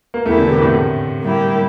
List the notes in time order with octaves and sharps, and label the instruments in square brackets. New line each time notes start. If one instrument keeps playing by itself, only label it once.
[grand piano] A#3
[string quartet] E2 E3 A#3 E4 G4 [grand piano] A3
[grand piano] D3
C3
A2
A2
[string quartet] G3 A#3 E4 G4